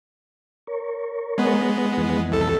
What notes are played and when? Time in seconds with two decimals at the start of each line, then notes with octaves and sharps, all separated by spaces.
0.67 A#4 C#5
1.38 G#3 B3
1.97 F2 E3
2.32 C2 A4